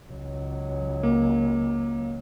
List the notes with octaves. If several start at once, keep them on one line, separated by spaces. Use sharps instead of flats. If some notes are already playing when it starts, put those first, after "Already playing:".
C#2 F#3
A#3